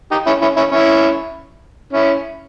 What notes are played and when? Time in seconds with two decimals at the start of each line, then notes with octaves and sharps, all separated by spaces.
0.11 D#4 G4
0.26 C#4 E4
0.42 C#4 E4
0.57 C#4 E4
0.72 C#4 E4
1.93 C#4 E4